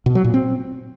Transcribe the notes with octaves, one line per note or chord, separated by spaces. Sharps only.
B2
F#3
A#2
C4